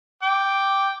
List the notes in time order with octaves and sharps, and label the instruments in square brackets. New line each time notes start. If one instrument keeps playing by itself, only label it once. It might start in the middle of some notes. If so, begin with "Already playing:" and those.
[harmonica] G5 D6